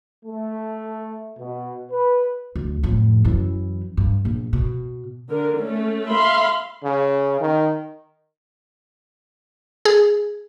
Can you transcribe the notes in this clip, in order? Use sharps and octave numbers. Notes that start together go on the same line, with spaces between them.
A3
B2
B4
D2
F2 A2
F#2 E3
G2
A#1
B2
D3 A#4
A3 C#4
E5 F5 B5 C6
C#3
D#3
G#4